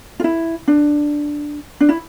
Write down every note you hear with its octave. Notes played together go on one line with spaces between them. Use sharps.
F4
E4
D4
D4
E4